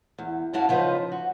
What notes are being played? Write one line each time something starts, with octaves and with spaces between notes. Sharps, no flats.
E2
F#2 E4 F#4 F5 A5
C#3 F3 D#4 B4 C5
F#4